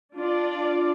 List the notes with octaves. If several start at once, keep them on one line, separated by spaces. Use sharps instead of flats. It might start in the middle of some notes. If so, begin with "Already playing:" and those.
D4 F4 D5